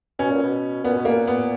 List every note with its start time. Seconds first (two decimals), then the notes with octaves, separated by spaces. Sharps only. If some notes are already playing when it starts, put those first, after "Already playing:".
0.19 B2 C#4
0.31 A#2
0.43 B2
0.84 A#2 B3
0.96 B2
1.05 A#3
1.08 A#2
1.27 B3